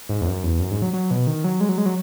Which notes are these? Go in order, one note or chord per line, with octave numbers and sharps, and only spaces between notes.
G#2
E2
F#2
E2
F#2
G#2
F#3
F#3
B2
D#3
F#3
G#3
F#3
G#3
F#3